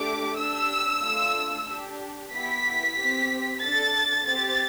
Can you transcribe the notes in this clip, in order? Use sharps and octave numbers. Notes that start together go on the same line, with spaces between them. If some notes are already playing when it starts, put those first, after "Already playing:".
Already playing: A3 D4 G4 D6
D4 G4 E6
A3 D4 F4
D4 G4
B3 E4 G4 B6
C4 G4
D4 A4 A6
C4 G4 A6